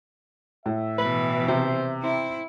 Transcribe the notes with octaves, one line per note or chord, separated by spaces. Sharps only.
A2 E5
B2 E3 B4
C3 C5
C4 E4